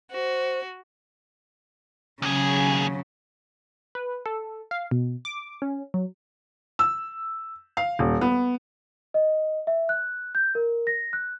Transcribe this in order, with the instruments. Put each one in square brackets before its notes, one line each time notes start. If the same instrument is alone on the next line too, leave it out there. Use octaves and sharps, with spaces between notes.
[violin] F#4 [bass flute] C5
[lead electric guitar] D#2 G#4 [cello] C#3 F#3
[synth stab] B4
A4
F5
B2
D6
C#4
F#3
[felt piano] E6
F5
D#1
B3
[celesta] D#5
E5
F#6
G6
A#4
A#6
F#6